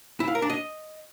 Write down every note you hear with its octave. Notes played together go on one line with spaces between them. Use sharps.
E4
F5
A#4
D4
D#5